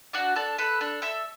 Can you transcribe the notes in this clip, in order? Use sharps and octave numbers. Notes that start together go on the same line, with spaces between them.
D4 F#4 F#5
D4 A4 A5
A4 B4 B5
D4
A4 E5 E6